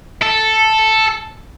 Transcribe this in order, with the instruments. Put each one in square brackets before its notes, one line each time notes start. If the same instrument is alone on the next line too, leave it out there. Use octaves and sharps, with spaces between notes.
[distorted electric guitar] A4